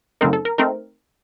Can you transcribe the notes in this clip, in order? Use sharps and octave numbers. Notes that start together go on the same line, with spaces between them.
F#2 C#3 A3 C4 D#4 A#4
A4
A#4
A3 C4 D#4 A#4